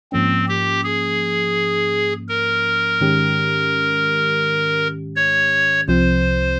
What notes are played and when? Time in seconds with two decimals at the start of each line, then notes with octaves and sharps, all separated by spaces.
0.12 G#2 F3 A#3 C4 C#4
0.48 G4
0.84 G#4
2.29 A#4
3.01 G#2 D#3 G#3 C#4 G4
5.16 C#5
5.88 C2 C3 F3 C4 C5